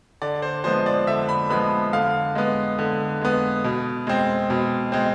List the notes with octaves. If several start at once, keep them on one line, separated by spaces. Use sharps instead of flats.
D3 D5
C5
F3 G#3 B3 C5
D5
D3 E5
B5
F3 G#3 B3 B5
D3 F5
G#3 B3
D3
G#3 B3
B2
G#3 C4
B2
G#3 C4